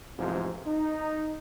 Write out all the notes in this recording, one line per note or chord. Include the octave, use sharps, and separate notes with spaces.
A1 F2 G#2 C3 F3
D#4